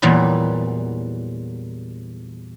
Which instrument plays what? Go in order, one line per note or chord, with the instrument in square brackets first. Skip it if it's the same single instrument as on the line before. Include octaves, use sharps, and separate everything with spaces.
[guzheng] E2 A#2 E3 F#3 G3